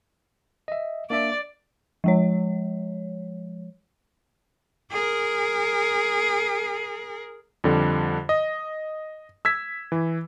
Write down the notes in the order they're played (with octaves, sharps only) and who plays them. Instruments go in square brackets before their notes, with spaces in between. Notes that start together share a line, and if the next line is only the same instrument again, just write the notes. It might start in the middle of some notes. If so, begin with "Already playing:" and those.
[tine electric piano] D#5 E5
[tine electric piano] A#3 D4 E5 [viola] D5
[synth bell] F3 G#3 C#5
[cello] G#4 A#4
[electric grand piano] F2 D3 G3
D#5
E6 G#6 B6
E3